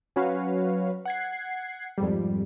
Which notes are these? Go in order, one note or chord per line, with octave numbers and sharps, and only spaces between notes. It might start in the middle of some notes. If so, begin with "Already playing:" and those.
F#3 C#4 F#4 B4 C#5 F5
F#5 G#6 C7
F2 G#2 G3